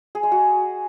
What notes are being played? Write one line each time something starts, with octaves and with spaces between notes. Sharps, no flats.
G#4
G#3
F#4